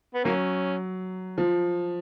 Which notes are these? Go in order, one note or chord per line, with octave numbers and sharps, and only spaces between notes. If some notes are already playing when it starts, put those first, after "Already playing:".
B3
F#3 A#3 C#4
F3